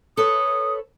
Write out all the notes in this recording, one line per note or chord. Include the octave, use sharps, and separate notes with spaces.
A4 B4 C#5 D#6